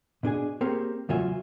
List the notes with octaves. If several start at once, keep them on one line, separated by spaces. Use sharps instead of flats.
B2 D4 G#4 G#5
A#3 C4 C#4 G4 G#4 A#4
E2 C#3 F#3 F4 E5 G#5